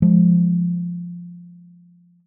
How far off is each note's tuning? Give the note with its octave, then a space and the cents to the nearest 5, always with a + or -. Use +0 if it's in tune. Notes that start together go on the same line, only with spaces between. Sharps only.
F3 +0 G#3 +0